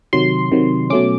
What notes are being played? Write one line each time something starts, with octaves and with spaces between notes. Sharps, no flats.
C3 D#3 F#3 C6
C3 D#3 F#3
B2 F#3 A3 C#4 D6